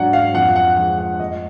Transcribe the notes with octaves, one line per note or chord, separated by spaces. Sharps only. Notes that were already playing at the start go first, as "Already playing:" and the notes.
Already playing: G#2 F#3 D4 F#5
F5
F2 F#5
F#5
F3 G#3 F#5
F#5
F1 D#5